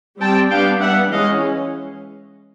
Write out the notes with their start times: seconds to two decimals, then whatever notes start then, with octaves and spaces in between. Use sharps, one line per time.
0.20 G3 C4 G5 A5
0.50 G3 B3 D4 F5 G5
0.81 G3 B3 D4 E5 F#5
1.11 E3 G#3 C#4 D#5 F5